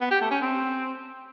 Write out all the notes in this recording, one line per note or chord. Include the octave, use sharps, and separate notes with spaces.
B3
G4
A3
C#4
C4